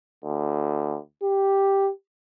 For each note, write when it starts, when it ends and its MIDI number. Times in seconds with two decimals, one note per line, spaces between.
0.24 0.98 38
1.23 1.91 67